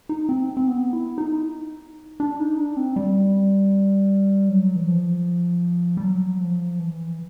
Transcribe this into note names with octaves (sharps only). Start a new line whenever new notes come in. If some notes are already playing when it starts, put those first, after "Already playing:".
D#4
C4
C4
B3
E4
D#4
D4
D#4
D4
C4
G3
F#3
E3
F3
G3
F#3
F3
E3